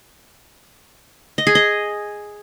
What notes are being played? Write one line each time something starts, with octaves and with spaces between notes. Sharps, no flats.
D#5
G#4
D#5